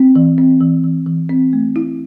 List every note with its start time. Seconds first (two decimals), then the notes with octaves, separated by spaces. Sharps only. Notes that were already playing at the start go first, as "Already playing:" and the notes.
Already playing: C4
0.16 E3
0.38 C4
0.60 E3
0.84 E3
1.06 E3
1.29 C4
1.53 A3
1.76 E4